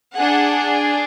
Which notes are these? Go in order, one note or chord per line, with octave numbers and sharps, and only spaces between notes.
D4 G#4 F#5